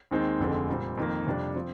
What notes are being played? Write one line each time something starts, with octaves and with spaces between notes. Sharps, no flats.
D#2 D#3 G#3 C4 D#4
F1 F2 D3 G#3 C4
A#2 G3 C4
F2 D#3 A#3
F2 C3 G3 D4 F4
F3 C4 F4